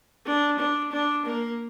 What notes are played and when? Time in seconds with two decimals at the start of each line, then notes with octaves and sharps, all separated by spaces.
0.26 D4
0.59 D4
0.92 D4
1.26 A#3